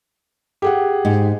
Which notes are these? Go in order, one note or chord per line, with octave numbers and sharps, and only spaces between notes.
G4 G#4 F#5
G#2